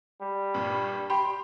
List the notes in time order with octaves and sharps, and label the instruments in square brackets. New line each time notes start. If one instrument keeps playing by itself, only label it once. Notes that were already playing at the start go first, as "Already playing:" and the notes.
[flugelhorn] G3
[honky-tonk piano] G2 A#2
[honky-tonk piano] G4 G5 C6 [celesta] B5